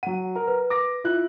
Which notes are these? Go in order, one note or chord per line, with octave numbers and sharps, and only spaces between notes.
F#3 F#5 D#7
A#4
B4
D6 A#6
E4 F4 F#6